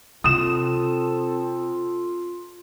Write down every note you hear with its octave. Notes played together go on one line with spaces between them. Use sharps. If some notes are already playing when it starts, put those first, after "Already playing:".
C3 C4 F4 A4 D#6 E7